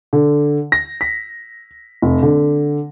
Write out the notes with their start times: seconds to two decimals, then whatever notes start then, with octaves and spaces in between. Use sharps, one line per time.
0.13 D3
0.72 A#6
1.01 B6
2.02 F1
2.23 D3